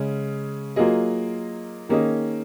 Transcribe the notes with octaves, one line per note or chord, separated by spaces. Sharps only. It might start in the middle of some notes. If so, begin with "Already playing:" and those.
Already playing: C#3 G#3 C#4 G#4
F#3 A#3 F4 G#4 D#5
D#3 A#3 C#4 G#4 D#5